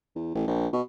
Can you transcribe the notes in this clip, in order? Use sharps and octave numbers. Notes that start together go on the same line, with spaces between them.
E2
A1
A#1
B2